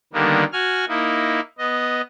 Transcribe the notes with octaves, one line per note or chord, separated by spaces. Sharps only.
D3 D#3 G3 A#3 B3
F#4 G#5 F6
A#3 D#4 E4
B3 D#5